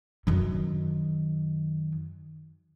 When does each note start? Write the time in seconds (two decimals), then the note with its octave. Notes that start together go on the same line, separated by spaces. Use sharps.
0.27 F#2 D#3